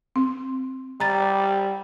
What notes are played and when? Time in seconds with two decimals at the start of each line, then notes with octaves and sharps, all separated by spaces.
0.16 C4
1.00 G3 A#5 A6